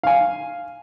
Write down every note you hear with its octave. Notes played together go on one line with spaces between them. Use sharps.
F5 G#5